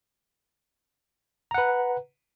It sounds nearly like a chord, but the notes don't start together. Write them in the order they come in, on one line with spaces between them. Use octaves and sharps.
A#5 F#5 B4